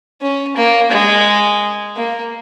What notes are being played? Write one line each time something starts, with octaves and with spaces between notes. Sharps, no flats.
C#4
A#3
G#3
A#3